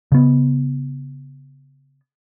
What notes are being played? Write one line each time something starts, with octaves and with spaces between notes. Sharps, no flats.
C#3 B3